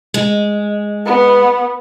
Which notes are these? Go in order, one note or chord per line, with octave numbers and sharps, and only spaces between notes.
G#3
B3